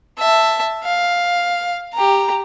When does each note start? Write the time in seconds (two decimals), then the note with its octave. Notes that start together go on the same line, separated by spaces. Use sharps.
0.18 E5 A5
0.84 F5
1.94 G4 A#5